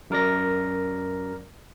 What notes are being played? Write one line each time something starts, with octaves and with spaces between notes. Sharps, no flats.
F#2 A#4 D5 A#6